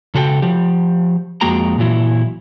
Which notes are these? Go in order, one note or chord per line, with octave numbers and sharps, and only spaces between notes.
C#3 F#4 A4 B4 G5
F3 G4
F2 G#3 A#3 F#4 G5 A#5
A#2 E3 F#3 E4